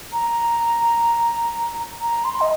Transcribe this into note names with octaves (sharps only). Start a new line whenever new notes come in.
A#5
A#5
C6
D#5